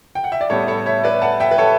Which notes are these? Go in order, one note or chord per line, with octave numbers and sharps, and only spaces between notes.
G5
F#5
E5
D5
A2 G3 B3 A4 C#5
A4 C#5
C#5 E5
B4 D5
F#5 A5
E5 G5
B4
A4 C#5